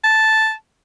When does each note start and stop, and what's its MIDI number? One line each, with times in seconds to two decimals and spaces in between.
0.04 0.53 81